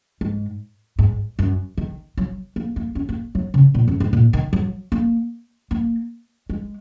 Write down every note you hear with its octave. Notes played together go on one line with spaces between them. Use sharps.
G#2
G#2
F#2
D#3
F#3
A#3
A#3
C#4
A#3
F#3
C#3
A#2
F#2
G#2
A#2
D#3
F#3
A#3
A#3
G#3